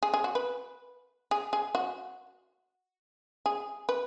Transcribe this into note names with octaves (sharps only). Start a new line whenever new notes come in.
G#4
G#4
F#4
B4
G#4
G#4
F#4
G#4
B4